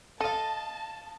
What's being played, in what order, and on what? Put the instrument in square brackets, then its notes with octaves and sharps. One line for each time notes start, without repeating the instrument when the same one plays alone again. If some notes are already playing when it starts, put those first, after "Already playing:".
[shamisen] A4 [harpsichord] D#5 F5 [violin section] A5